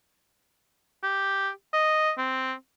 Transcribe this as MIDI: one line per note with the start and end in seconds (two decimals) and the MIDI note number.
1.04 1.49 67
1.73 2.12 75
2.18 2.53 60